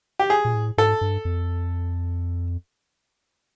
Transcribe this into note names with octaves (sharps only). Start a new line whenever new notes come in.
G4
G#4
A#2
A2
G#2 A4
G2
F2